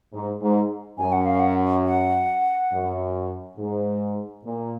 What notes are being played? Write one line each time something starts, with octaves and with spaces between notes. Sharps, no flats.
G#2
G#2
F#2 G#5
F#5
F5
F#5
F#5
F#2
G#2
A#2